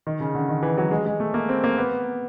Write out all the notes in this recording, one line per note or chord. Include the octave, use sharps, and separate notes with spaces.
D#3
C#3
D3
D#3
E3
F#3
G#3
G#3
A3
A#3
C4
A#3
B3